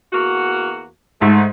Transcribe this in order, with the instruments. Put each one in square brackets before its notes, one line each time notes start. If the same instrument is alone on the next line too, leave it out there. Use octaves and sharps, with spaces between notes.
[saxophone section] E2 A#3 F#4
[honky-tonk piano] G#2 [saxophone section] A3